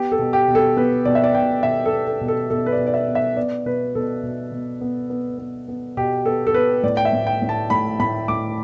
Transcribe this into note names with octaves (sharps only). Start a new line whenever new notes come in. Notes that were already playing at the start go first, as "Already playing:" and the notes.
Already playing: B3 G4
A4
B2
G4
B2
A4
B3 B4
B2 D5
E5
D5
B2 G5
B2 E5
A4
B3
A4
B2
A4
B2 A4
B4
D5
B2
D5
E5
B3
E5
B3 D5
B2 B4
B2 A4
B2
B2
B3
B3
B3
B3
B2 G4
B3 A4
A4
B3 B4
A2 D5
G5
E5
A2
G5
A2
A5
A2 B5
A2 B5
A2 D6